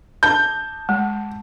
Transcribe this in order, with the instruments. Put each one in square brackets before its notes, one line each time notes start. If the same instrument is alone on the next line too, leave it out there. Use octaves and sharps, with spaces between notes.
[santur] A5 [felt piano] G6
[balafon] G#3